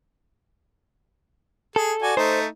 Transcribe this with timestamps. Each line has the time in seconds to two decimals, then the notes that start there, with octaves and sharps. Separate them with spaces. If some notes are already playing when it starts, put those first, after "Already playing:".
1.76 G#4 A4
2.03 F#4 D5 G#5
2.17 A3 D#4 C5